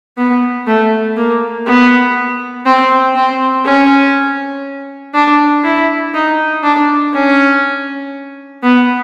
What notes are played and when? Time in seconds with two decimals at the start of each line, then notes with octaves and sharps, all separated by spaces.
0.17 B3
0.67 A3
1.17 A#3
1.66 B3
2.66 C4
3.16 C4
3.65 C#4
5.14 D4
5.64 E4
6.14 D#4
6.63 D4
7.13 C#4
8.63 B3